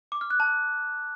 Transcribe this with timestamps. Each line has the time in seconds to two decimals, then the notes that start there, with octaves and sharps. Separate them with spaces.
0.12 D6
0.21 F6
0.30 F#6
0.40 A5